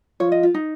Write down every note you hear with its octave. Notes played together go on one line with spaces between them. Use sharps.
F3 C#5
D#5
F4
D#4